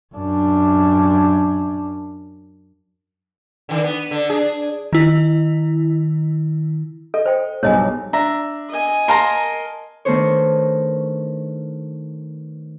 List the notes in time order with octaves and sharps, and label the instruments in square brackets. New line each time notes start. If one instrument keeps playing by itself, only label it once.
[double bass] F#2 D4
[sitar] D3 D#3
B3
D3
D4 G#4
[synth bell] D#3 E4
[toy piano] A4 [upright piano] D#5
[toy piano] C5 G5
[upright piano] B1 G2 [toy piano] C#5 D#5 G#5
[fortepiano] D4 E5 [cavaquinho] A#5
[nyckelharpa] D#5 G#5
[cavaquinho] A#4 A5 A#5 [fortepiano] F5 C6
[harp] D#3 A3 B3 D4 C5 C#5